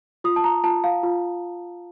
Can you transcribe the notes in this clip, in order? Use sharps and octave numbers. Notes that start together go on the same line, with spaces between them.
F4 D#6
A5
A#5
F4 A5
F5
F4